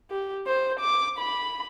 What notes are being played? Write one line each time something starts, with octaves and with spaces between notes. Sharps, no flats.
G4
C5
D6
B5